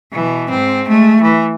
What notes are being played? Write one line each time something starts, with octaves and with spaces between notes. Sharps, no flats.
B2 E3
G#2 C4
G#3 A3
E3